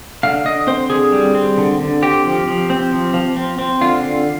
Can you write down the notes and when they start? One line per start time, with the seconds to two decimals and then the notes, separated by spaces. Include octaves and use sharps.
0.23 D3 F5
0.45 D3 D#5
0.67 C4 C5
0.90 D3 G#4
1.12 G3
1.35 C4
1.58 D3
1.80 D3
2.02 C4 G4
2.25 F3
2.47 F3
2.70 C4
2.92 F3
3.14 F3
3.36 C4
3.58 C4
3.81 D3 F4
4.03 D3